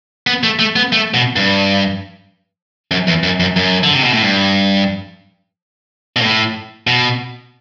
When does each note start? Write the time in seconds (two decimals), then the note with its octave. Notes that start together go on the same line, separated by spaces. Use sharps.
0.27 B3
0.43 A3
0.59 A3
0.76 B3
0.93 A3
1.14 B2
1.36 G2
2.91 F#2
3.07 E2
3.23 F#2
3.40 F#2
3.56 F#2
3.83 D3
3.93 C3
4.04 B2
4.13 A2
4.22 G2
6.16 B2
6.21 A2
6.87 B2